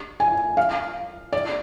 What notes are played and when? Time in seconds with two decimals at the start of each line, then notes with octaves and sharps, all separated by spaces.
0.20 G#5
0.57 F5
1.33 D5